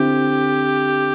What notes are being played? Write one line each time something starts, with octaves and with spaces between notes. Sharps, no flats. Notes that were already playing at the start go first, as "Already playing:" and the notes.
Already playing: D3 C4 E4 G4